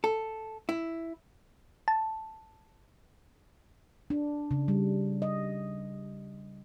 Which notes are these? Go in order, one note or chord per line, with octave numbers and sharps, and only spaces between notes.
A4
E4
A5
D4
C#3
G3
D#5